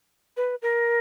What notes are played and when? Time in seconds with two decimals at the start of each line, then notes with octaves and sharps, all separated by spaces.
0.37 B4
0.62 A#4